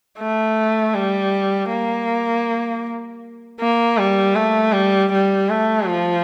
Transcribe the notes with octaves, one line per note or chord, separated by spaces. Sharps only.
A3
G3
A#3
A#3
G3
A3
G3
G3
A3
F3